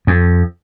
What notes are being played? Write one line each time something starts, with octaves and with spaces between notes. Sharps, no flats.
F2